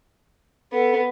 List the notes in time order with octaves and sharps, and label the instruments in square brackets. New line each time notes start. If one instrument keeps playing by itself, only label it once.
[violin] B3 [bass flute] A4